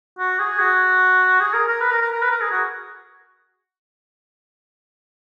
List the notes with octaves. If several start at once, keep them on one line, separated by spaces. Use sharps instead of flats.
F#4
G#4
F#4
G#4
A#4
A#4
B4
A#4
A#4
A#4
B4
A#4
G#4
F#4